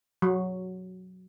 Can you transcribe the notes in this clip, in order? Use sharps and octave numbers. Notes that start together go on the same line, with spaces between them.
F#3